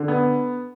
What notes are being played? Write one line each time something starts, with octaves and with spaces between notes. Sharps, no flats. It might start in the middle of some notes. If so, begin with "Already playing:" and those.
Already playing: D3
B3